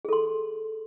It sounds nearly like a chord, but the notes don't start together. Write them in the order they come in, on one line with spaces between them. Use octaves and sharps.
G#4 A4 C6